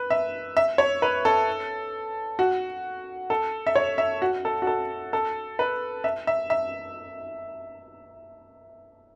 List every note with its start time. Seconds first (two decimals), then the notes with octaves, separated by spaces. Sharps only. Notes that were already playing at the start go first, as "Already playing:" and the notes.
Already playing: B4
0.10 E5
0.57 E5
0.78 C#5
1.02 B4
1.25 A4
2.39 F#4
3.30 A4
3.67 E5
3.76 C#5
3.98 E5
4.22 F#4
4.45 A4
4.62 F#4
4.67 A4
5.13 A4
5.59 B4
6.04 E5
6.27 E5
6.50 E5